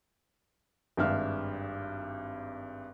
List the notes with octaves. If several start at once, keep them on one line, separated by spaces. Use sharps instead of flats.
G#1 G2 G#3 E5 F5 F6